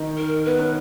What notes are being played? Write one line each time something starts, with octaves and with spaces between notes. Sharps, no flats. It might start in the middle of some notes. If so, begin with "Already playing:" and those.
Already playing: D#3 D#4
A#4
B3 B4
C#4